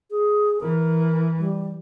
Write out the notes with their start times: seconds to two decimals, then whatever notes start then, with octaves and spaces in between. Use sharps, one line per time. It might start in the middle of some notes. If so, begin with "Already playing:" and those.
0.11 G#4
0.61 E3 A#4
1.39 G3